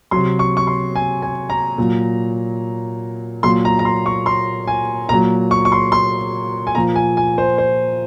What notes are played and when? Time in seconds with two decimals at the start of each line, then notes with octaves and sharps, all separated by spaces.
0.11 C3 F#3 C6
0.39 C#6
0.57 C#6
0.67 C6
0.95 G#5
1.22 G#5
1.50 A#5
1.78 A#2 F#3
3.43 A#2 F#3 C6
3.65 A#5
3.79 A#5
3.85 C6
4.06 C#6
4.26 C6
4.68 G#5
5.09 A#2 F#3 A#5
5.51 C#6
5.65 C#6
5.72 C6
5.92 C6
6.67 G#5
6.75 A#2 F3 A#5
6.96 G#5
7.17 G#5
7.38 C5
7.58 C5